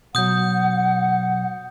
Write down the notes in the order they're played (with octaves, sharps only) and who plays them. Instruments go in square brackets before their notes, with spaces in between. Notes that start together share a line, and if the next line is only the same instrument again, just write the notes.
[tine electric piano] B2 F#3 [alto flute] F#5 [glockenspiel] D#6 G6